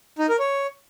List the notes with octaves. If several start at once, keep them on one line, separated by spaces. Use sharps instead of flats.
D#4
A#4
C#5